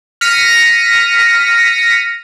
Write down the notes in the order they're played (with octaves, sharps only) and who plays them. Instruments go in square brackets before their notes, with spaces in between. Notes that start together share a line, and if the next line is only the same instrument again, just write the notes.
[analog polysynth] F6 A#6 B6 C#7 D#7